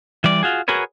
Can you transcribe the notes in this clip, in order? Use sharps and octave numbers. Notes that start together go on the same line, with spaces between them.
E3 G3 D5
F4 F#4 G#4
F#4 G#4 A#4 B4 C#5